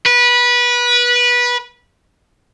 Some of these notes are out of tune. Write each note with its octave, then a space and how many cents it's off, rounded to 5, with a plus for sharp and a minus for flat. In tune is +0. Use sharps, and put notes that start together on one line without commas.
B4 -20